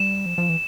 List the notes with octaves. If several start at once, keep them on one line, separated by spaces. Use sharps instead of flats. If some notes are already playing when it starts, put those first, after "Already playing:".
Already playing: G3 E7
F3
F3
E3